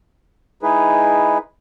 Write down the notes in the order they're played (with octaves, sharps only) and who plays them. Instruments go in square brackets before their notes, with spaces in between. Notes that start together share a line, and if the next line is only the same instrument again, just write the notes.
[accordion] G#3 D#4 E4 G#4 B4